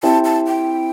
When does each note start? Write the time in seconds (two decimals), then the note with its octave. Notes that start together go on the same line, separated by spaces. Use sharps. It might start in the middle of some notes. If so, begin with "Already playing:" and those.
0.03 C4 E4 G4 A5
0.25 A5
0.47 G5